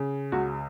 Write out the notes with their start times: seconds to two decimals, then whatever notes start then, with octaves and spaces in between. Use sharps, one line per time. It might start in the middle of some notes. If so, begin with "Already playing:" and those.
Already playing: C#3
0.32 C#2 F#4